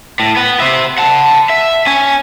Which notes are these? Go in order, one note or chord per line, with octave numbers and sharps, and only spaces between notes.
A2
B3 B4
C5 E5
F#5 A5
E5
C#4 G#5